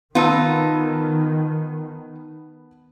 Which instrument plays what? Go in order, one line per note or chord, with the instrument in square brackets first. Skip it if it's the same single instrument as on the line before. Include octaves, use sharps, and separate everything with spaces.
[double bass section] D#3 [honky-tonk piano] B3 A5 E6 [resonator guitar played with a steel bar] D#4 F4